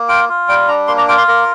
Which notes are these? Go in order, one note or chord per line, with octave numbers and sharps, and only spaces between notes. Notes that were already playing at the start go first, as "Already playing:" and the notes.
Already playing: A#3
F4 G5
F4
G3 G5
D4 A#5
A#3 C6
A#5
F4 G5
C6
A#3 A#4